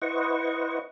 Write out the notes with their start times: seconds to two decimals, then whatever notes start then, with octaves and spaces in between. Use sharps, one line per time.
0.02 E4 B4 C5 D#5 F#5 C#6